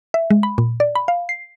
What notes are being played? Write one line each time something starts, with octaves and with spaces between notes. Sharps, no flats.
E5
G#3
B5
A#2
D5
B5
F5
C7